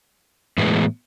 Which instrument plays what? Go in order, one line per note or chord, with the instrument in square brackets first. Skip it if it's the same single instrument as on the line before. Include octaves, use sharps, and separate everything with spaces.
[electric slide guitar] A2 E3 G#3 B3